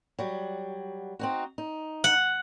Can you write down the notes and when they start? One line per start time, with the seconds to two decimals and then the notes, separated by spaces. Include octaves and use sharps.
0.19 F#3 G3
1.19 C4 D#4 F#4
1.58 D#4
2.04 F#5